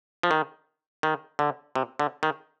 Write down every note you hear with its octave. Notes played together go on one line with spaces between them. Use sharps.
F3
D#3
D#3
D3
C3
D3
D#3